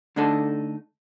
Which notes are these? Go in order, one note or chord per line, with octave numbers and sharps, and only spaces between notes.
D3 A3 D4 D#4 A4